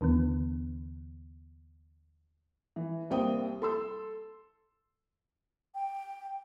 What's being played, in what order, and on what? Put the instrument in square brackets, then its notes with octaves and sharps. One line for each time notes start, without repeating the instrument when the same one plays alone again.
[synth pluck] D#2 D3 E3 B3
[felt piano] E3
C2 A#3 C4 G5 D#6
A4 C6 E6
[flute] G5